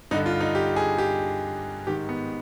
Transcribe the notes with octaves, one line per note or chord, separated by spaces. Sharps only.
G2 D3 D#4
F4
D#4
G4
G#4
G4
G#2 D#3 G4
B3